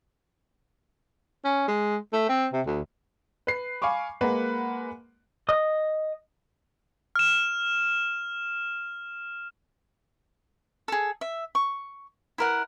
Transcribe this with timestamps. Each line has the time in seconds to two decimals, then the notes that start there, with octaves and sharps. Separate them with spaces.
1.44 C#4
1.68 G#3
2.13 A3
2.29 C4
2.53 C3
2.66 D2
3.47 B4 C7
3.82 F5 G#5 B5 C#6 D6
4.21 G#3 A#3 A#4 B4 F#5
5.49 D#5 D#6
7.16 F6 E7
10.88 G#4 A4
11.21 E5
11.55 C#6
12.38 E4 A#4 F#5